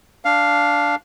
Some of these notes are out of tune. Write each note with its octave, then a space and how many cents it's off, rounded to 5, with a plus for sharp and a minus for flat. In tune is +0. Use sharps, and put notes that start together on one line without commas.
D4 -10 F5 +0